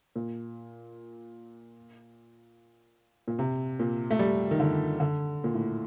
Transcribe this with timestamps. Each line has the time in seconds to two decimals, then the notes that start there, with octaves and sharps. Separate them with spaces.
0.16 A#2
3.28 A#2
3.39 C3
3.80 A#2
4.10 A3
4.19 G3
4.51 D#3
4.60 D3
5.00 D3
5.44 A#2
5.54 A2